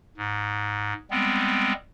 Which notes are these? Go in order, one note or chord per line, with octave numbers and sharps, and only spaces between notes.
G#2
G3 G#3 B3 C4